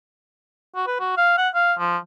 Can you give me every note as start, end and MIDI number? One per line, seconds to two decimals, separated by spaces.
0.76 0.86 66
0.87 0.95 71
1.00 1.16 66
1.17 1.33 77
1.38 1.49 78
1.54 1.73 77
1.79 1.97 53